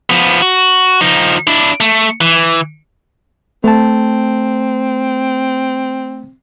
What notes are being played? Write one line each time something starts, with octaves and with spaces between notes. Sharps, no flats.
F3 B3
F#4
F3 D#4
D4 E4
A3
E3
A3 C4 A5